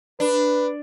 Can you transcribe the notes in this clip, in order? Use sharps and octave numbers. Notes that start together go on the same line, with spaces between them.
D4 B4